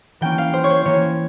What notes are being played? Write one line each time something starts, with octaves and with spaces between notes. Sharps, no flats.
E3 A#3 C#4 G5
F5
C5
C#5
C5
E3 A#3 C#4 C#5